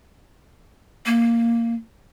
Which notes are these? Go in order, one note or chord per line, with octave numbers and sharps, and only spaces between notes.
A#3